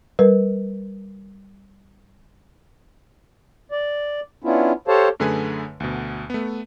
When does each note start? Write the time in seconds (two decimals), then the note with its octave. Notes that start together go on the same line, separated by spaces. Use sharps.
0.19 G3 A#4 B4
3.71 D5
4.44 B3 C#4 D4 E4 F4
4.88 G4 A4 C5 C#5 F5 A5
5.20 F#2 D3 A3 G#4 B4 G#5
5.80 D2 B2
6.30 A3 B3